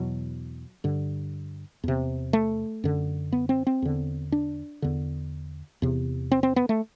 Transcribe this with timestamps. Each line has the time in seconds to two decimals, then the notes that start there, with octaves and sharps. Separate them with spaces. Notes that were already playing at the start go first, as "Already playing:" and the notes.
Already playing: E2 B2 F#3
0.84 G2 D3
1.84 E2 C3
2.33 A3
2.84 F#2 D3
3.33 B3
3.49 C4
3.67 C4
3.82 E2 D3
4.32 D4
4.82 E2 D3
5.82 E2 C3
6.32 C4
6.43 C4
6.56 B3
6.69 A3